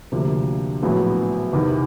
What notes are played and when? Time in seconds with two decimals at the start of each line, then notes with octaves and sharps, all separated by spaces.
0.12 D2 C3 F3 A#3 D4
0.83 A#1 A2 F#3 B3
1.53 E2 C3 D#3